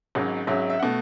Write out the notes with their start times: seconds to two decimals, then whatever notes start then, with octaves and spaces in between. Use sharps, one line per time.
0.15 G#1 G#2 F#3 C#4
0.47 G#1 G#2 F#3 C#4 E5
0.70 E5
0.80 B2 A3 F#5